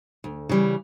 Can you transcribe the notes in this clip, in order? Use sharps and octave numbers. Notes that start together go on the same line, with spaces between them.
D2
C#3 E3 G3